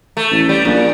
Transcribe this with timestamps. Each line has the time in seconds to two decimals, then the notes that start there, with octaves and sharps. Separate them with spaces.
0.17 A3
0.31 A1
0.49 G3
0.65 A#1 A#2